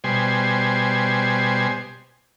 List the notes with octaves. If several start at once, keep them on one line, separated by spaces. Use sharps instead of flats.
B2 G3 C5 G#5